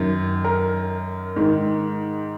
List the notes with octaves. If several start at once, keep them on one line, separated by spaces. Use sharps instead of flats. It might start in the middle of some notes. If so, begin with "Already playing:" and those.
Already playing: F#2 D#3
A#4
G#2 D#3